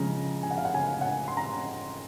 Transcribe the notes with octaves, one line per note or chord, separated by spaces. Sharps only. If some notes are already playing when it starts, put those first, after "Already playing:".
Already playing: C#3 F3 G#3 A#5
G#5
F#5
F5
F#5
G#5
F#5
G#5
C6
A#5